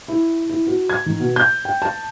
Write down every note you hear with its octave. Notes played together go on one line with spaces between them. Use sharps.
E4
E4
F#4
G#6
D#3
B2
G6
G5
A5